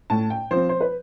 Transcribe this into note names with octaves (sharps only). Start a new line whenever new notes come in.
A2 A5
G5
F3 C4 C5
C5
B4